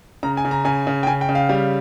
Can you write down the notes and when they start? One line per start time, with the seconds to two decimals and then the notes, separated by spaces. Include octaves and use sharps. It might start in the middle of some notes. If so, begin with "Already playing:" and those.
0.23 C#3 A#5
0.37 G#5
0.45 C#3
0.51 A#5
0.65 C#3 G#5
0.87 C#3
1.03 G5
1.07 C#3 G#5
1.21 G5
1.29 C#3
1.35 F5
1.49 G3 F5